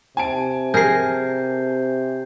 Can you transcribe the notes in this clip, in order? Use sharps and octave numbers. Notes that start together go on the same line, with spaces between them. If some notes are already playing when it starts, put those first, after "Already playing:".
C3 G#5 A5 D7
G#4 A#4 G6 C7